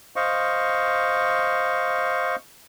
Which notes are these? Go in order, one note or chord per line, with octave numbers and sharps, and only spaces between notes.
C5 D#5 F5 C#6